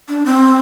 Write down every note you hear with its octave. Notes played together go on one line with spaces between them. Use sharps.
D4
C4